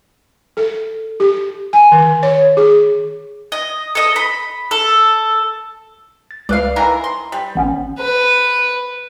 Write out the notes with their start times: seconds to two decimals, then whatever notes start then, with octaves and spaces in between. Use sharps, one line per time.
0.57 A4
1.20 G4
1.73 G#5
1.92 D#3
2.23 C#5
2.57 G#4
3.52 D#5
3.95 A4 D#5
4.16 B5
4.71 A4
6.31 A6
6.49 C#2 B4 D5 F5
6.76 D#3 E3 A#4
7.04 C6
7.32 G3
7.55 A1 B3 C#4
7.99 B4